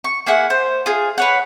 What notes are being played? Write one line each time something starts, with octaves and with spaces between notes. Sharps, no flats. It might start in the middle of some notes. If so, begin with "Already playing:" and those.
C#6
A#3 E4 G#4 F#5
C5
F4 G#4
B4 C#5 F#5